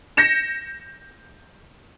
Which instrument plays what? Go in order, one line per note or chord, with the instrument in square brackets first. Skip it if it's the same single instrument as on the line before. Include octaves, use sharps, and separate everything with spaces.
[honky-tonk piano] G6 A#6 C#7 E7